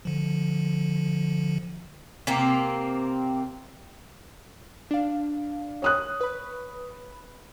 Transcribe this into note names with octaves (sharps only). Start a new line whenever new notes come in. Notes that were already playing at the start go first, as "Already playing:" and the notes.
D3 F3
C3 A#3 C4
D4 F5
C#5 D#6 F#6
B4 B5